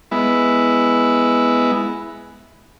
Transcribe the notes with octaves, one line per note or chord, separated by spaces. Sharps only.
G#3 B3 E4